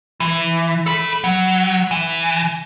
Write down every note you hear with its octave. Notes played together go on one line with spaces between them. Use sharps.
E3
A4 B5
F#3
E3